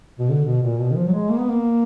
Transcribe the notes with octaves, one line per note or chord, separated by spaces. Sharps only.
B2
D3
B2
A#2
B2
D#3
F3
F#3
G#3
A#3
B3
A#3